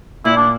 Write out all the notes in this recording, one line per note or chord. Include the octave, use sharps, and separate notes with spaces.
A#2 E4
D4